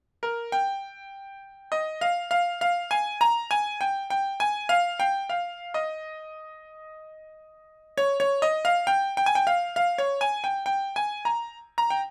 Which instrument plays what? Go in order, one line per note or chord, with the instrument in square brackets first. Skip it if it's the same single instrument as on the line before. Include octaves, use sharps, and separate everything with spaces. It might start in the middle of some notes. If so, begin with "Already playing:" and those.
[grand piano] A#4
G5
D#5
F5
F5
F5
G#5
A#5
G#5
G5
G5
G#5
F5
G5
F5
D#5
C#5
C#5
D#5
F5
G5
G5
G#5
G5
F5
F5
C#5
G#5
G5
G5
G#5
A#5
A#5
G5